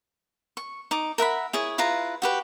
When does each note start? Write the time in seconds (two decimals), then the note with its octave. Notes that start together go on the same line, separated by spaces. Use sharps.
0.57 C#6
0.91 D#4 D6
1.18 A#4 E5 F#5 B5
1.53 E4 G#4 C#5
1.78 E4 F4 B4 A#5
2.22 F#4 G4 B4